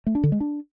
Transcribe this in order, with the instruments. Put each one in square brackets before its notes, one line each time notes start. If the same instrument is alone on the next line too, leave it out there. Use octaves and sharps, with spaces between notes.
[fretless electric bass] A3
D4
D3
G#3
D4